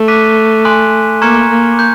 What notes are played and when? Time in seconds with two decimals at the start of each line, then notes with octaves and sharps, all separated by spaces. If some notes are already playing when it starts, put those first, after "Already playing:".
Already playing: A3
0.08 D6 F#6 B6 D#7
0.65 G#5 C6 D#6 F#6
1.22 A#3 A#5 C#6 F6 G#6 C#7
1.50 A#3
1.79 G6